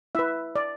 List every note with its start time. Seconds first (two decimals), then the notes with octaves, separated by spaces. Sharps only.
0.15 E4 B4 E5
0.56 D5